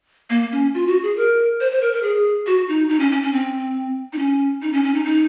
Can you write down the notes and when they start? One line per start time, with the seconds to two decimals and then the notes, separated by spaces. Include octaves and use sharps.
0.30 A#3
0.52 C#4
0.74 F4
0.88 F#4
1.03 G#4
1.17 A#4
1.60 C5
1.71 C5
1.81 A#4
1.93 A#4
2.03 G#4
2.46 F#4
2.68 D#4
2.89 D#4
2.99 C#4
3.11 C#4
3.22 C#4
3.33 C4
4.13 D#4
4.18 C#4
4.62 D#4
4.73 C#4
4.84 C#4
4.94 D#4
5.05 D#4